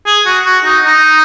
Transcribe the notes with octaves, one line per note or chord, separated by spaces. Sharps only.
G#4
F#4
F#4
D#4
D#4